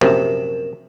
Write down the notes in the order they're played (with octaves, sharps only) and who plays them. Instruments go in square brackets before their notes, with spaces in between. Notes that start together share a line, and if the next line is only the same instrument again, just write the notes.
[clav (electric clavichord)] A#1 F#2 C3 [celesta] A#4 E7